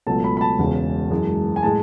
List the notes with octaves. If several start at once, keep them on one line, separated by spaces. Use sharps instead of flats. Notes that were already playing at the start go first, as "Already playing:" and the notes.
C#2 B2 F#3 A3 A5
B5
B5
A5
E1 E2 C#3
F#2 E3 G#3
G#5
A2 G#3 A5